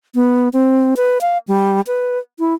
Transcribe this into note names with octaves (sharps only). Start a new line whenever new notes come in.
B3
C4
B4
F5
G3
B4
E4